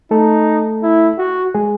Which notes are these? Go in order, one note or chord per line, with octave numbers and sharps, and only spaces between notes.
A3 D#4 A4
E4
F#4
G#3 G#4